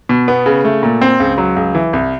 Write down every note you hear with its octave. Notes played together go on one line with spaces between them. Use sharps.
B2
B3
C#3
A3
A#2
C4
C#2
F#3
C#2
E3
C2